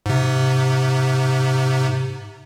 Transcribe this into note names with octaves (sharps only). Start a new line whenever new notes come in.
G#2 C3